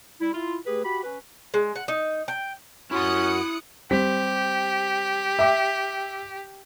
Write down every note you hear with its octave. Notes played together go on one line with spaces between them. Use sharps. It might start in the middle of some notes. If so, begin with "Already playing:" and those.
G3 E4
E4 F4
A3 G4 G#4 B4
F#4 G4 B5
C#4 B4
G#3
F#5
D#4
G5
F#2 C#4 E4 F#4 C6 D#6 F#6 C#7
G3 C4 G4 B6
E5 G5 D6